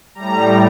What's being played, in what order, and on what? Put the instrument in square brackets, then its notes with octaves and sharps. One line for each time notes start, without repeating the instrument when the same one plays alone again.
[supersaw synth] A2 G3 A#5